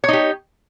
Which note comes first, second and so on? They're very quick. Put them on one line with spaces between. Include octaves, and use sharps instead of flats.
C#5 D#4 G4